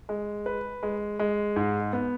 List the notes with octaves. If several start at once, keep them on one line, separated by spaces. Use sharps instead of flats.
G#3
B4
G#3
G#3
G#2
B3